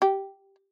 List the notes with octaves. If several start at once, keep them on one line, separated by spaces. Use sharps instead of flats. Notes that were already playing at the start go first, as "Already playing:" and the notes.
G4